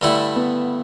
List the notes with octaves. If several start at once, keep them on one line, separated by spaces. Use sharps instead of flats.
G2 D3 A3 E4
B3